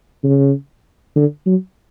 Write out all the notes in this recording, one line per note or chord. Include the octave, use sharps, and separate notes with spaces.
C#3
D3
F#3